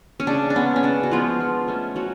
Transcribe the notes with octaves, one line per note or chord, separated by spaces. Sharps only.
C#4
C#3 D4
D4
G#3 B3 C#4
C#4
C#3 D4
F#4
F3 G#3 B3 F4
F3
A3 C#4
F3 F#3 F#4